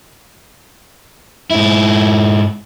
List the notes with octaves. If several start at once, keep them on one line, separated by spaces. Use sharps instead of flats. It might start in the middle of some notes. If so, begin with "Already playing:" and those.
G#2 E4